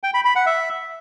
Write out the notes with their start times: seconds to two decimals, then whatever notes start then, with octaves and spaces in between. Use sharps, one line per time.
0.04 G5
0.14 B5
0.25 B5
0.36 F#5
0.46 E5